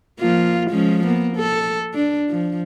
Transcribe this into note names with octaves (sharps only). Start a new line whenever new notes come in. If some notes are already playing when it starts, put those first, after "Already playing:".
F3 A#3 F4
F3 G#3 C#4
A#3 B3
A4
D4
F3